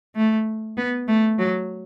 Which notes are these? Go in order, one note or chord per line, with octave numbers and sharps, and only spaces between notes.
A3
B3
A3
F#3